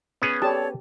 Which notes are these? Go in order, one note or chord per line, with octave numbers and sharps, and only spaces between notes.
B3 C#4 G#4
G4 A4 C#5 D5 A5